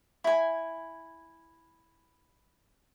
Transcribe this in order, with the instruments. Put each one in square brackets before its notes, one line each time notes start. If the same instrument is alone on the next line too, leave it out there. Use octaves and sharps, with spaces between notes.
[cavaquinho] E4 G#5